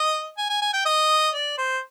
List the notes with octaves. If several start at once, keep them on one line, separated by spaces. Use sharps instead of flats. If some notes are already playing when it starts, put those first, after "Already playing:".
Already playing: D#5
G#5
G#5
G#5
G5
D#5
D5
C5